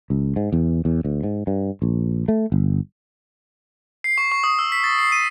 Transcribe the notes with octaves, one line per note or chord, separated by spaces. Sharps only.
C#2
G#2
E2
E2
D2
G#2
G2
A#1
A3
G1
C7
C#6
C#6
D#6
E6
B6
A6
C7
D#7